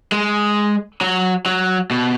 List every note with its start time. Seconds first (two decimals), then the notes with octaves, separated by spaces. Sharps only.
0.12 G#3
1.01 F#3
1.46 F#3
1.91 B2